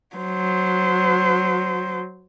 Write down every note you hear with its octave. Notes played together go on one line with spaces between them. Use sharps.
F#3 C5